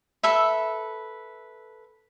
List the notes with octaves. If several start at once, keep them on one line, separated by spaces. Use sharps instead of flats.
A4 B4 E5